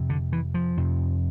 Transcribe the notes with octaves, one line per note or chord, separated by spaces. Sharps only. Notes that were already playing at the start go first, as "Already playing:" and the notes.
Already playing: F2 C3
D3
E3
F3
F2 C3